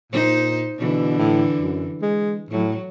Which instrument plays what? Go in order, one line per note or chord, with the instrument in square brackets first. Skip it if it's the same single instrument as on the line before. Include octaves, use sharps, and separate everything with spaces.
[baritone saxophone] A#2 [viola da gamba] D#4 C5
[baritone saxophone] B2 [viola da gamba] D3 E3
[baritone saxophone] A2
F#2
G#3
[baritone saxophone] A2 [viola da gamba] F#3